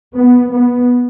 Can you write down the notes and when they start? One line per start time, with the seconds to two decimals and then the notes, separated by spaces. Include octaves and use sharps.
0.14 B3
0.51 B3